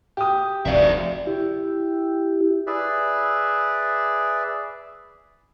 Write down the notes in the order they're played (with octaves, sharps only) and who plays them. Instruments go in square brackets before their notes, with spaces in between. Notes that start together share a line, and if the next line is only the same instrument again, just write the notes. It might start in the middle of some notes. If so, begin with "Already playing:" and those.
[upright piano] G4 D#6
[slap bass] F1 D2 G#2 [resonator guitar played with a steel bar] C3 D5 F5 [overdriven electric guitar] F#4 E5
[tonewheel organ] E4 G4
[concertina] G#4 B4 D5 E5